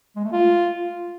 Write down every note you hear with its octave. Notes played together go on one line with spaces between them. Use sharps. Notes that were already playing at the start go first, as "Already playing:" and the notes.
G#3
A3
F4